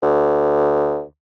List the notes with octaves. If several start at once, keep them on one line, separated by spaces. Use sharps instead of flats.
D2